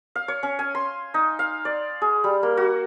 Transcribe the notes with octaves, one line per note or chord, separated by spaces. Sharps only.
F5
C#5
C#4
G#5
C6
D#4
F5
D5
G#4
G3
A#3
F#4